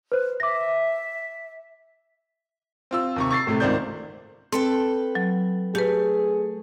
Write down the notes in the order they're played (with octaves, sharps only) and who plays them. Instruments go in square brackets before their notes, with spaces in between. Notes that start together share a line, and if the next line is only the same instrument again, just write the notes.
[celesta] B4 C5
[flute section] E5 [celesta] D6 A#6
[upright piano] C4 F4 E6
D#2 C3 C#6
C#6 A6 C7
A2 C3 A3
G#1 C#2 D#3 C5 D5 G6
[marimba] C4 [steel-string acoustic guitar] A4 B4 G5
[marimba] F#3
[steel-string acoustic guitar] A3 [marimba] G4 B4 [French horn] G#4